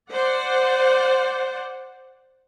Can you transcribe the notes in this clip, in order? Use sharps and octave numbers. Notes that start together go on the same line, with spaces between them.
C5 D5 F#5